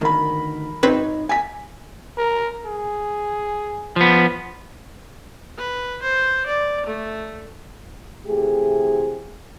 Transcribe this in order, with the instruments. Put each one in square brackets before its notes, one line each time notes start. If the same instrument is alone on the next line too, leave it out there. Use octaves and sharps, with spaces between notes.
[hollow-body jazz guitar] D2 G2 D#3 [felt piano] A#4 B5
[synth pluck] G#1 C4 B4 [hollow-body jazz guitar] D#4 C#5
[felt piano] G#5 B6
[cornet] A#4
G#4
[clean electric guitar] F3 B3
[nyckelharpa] B4
C5
D5
A3
[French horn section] C3 E3 A3 G4 G#4